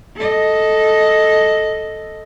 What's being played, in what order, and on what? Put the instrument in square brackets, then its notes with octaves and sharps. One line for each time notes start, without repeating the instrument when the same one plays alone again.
[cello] A4 D#5